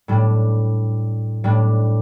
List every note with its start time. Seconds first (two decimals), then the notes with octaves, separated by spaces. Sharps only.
0.08 A2 G3 D4
1.44 A2 G3 D4